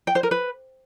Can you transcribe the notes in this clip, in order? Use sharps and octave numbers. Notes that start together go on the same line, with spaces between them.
G5
C5
A#4
B4